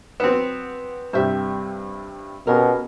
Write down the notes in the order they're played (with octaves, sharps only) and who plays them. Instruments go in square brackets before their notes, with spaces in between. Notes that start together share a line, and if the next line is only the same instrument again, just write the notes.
[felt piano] F#3 E7 [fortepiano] B3 C4
[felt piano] G2 C3 G3 [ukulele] C5 E5
[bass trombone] B2 [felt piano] C#4 G4 G#4 [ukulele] A#4